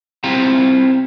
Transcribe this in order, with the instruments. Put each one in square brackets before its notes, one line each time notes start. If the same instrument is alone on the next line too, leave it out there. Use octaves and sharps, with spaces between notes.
[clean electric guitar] C4 E4 F4 G4 A#5